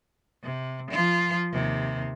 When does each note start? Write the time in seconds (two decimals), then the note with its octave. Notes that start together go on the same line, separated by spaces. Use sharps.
0.44 C3
0.91 F3 F4
1.53 D#2 C3